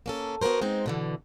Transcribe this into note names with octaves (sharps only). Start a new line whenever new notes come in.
A#3 C#4 A4
B3 F#4 G#4 A#4 C5
G#3 C4 D#4 C5
B2 D3 E3